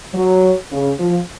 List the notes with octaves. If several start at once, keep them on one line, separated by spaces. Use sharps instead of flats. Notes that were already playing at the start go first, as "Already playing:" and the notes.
F#3
C#3
F3